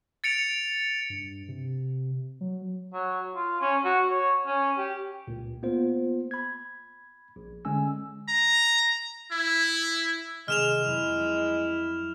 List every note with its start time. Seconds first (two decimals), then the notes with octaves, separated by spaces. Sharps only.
0.24 A6 C#7 D7 F7
1.10 G2
1.48 C3
2.41 F#3
2.93 F#3
3.36 F4
3.61 C#4
3.84 F#4
4.09 C#5
4.46 C#4
4.78 G4
5.27 C#2 A#2
5.63 A#3 B3 F4 C5
6.31 B5 G#6
7.36 A#1
7.65 D3 G#3 C#4 G#5 E6
8.28 A#5
9.32 E4
10.48 C3 D#3 G#3 G#4 F6 E7 F7
10.86 F2 F#3 E4